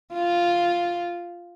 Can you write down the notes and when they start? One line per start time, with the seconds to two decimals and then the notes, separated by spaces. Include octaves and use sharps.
0.14 F4